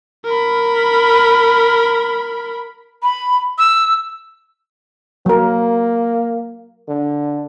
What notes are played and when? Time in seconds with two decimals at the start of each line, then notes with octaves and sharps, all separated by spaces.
0.25 A#4 B5
3.03 B5
3.58 E6
5.26 F#3 A#3 A#4
6.88 D3